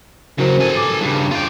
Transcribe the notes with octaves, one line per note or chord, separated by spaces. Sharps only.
C#3 F#3 F#4 A#4 C5
A4 G#5
D6
G2 C#3
F4 G5